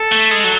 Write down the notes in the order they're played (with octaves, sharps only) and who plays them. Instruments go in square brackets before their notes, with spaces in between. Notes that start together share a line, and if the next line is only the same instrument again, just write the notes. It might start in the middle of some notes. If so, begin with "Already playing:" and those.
Already playing: [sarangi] A4
[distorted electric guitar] A3
G#3
F#3